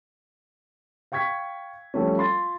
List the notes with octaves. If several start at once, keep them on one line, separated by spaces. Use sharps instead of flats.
F5 G5 C#6 G#6 B6
F3 G3 A3 C#4
F4 B5 C6 A6